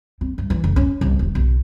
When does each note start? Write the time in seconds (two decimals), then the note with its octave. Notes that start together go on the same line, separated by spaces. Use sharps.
0.21 C4
0.38 G2
0.50 E3
0.64 F1
0.76 C#4
1.01 C2
1.19 D#1
1.35 B1